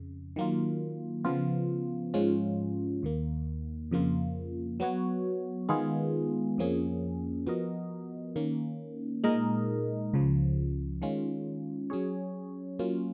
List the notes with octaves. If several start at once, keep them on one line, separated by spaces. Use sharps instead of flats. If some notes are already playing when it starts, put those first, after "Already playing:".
Already playing: F2 C#3
D#3 F#3 A#3 F4
C#3 F3 B3 F4
G#2 F3 G#3 C#4 F4
D#2 D#3 A#3
F2 C#3 F3 A#3 F4
F#3 B3 F#4 C#5
D#3 G#3 B3 F4 G#4
F2 F3 A#3 C#4 G#4
F3 B3 F#4 A#4 D#5
D#3 A#3 C#4
A#2 G#3 D#4 A#4 D#5
C#2 C#3 F3
D#3 G#3 C#4 F4
F#3 C#4 G#4 C#5
F#3 A#3 C#4 F4